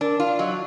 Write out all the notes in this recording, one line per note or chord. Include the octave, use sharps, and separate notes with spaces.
D4 A#4
F4 D5
F#3 D#5